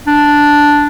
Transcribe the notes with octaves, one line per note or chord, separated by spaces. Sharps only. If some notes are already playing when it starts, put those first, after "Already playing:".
D4